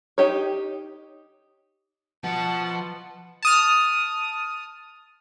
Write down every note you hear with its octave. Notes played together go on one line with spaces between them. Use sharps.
D#4 G4 C#5
B2 F3 F#5 A5
A5 D#6 F6